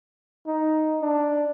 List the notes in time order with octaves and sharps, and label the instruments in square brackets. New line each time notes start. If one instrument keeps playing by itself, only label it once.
[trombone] D#4
D4